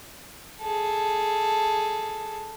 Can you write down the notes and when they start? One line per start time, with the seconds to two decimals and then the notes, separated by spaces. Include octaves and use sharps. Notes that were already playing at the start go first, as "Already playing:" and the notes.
0.61 G#4 A4